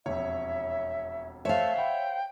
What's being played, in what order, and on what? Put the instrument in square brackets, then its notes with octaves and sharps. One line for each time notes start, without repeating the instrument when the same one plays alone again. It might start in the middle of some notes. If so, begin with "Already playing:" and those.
[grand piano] E1 F2 [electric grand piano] C#5 [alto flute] E5
[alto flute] A3 [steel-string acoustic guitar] C5 F5 [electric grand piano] C#5 E5
[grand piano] F#5 B5 [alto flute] G5